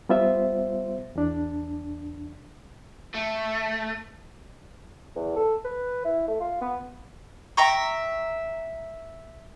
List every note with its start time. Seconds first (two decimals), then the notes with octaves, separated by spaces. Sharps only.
0.09 G3 B3 F4 C5 E5
1.15 E2 D4
3.14 A3
5.16 E2
5.36 A4
5.65 B4
6.05 E4
6.28 A3
6.40 F4
6.61 B3
7.57 E5 G5 A#5 C#6